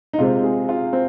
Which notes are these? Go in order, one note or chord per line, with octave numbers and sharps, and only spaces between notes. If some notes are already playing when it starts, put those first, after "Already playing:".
D#4
C3 G#3 C4 F4
G#4
F4
C4